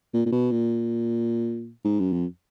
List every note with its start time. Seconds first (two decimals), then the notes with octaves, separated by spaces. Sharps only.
0.14 A#2
0.26 A#2
0.32 B2
0.51 A#2
1.84 G#2
1.99 F#2
2.12 F2